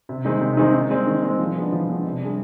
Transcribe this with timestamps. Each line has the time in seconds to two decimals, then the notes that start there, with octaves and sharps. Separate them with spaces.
0.09 C3
0.25 D#3 G#3 C4 D#4
0.41 C3
0.57 D#3 G#3 C4 D#4
0.74 D#3
0.90 G#3 C4
1.07 D#3
1.23 G#3 C4
1.38 F3
1.56 G#3 B3 D4
1.72 F3
1.88 G#3 B3 D4
2.04 C3
2.21 G3 D4 G#4